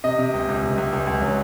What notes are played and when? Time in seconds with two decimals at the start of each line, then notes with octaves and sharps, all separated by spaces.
0.04 C3 D#5
0.19 C3
0.34 C#2
0.49 C#2
0.63 C3
0.78 C#2
0.93 C#2
1.07 C#2
1.22 F#3